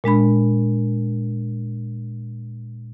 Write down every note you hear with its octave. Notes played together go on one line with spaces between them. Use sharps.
A#2 G#3 D4 B5